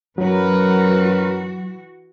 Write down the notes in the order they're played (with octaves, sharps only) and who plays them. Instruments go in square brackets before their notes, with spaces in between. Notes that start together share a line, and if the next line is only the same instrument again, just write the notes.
[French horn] F#2 [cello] E3 F#4 [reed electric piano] F#3 [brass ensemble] A#4 B4